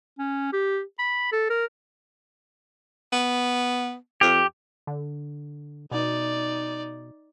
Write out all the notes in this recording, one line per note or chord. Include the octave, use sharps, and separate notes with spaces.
C#4
G4
B5
A4
A#4
B3
F2 G4
D3
B2 D#4 D5